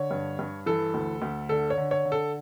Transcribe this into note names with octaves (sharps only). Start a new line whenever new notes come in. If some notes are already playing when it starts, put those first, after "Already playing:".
Already playing: D3 C#5
G2
G2
E3 A4
D2
D2
D3 A4
C#5
D3
C#5
D3
A4